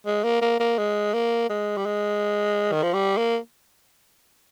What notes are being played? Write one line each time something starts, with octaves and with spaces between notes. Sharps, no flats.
G#3
A#3
A#3
A#3
G#3
A#3
G#3
G3
G#3
D#3
F3
G3
A#3